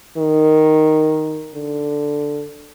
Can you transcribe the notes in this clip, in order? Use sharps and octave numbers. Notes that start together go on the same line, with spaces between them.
D#3
D3